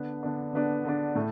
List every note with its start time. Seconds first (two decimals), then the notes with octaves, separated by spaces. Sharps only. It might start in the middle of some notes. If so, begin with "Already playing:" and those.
Already playing: D3 B3 D4
0.23 D3 B3 D4
0.53 D3 B3 D4
0.85 D3 B3 D4
1.15 A2 A3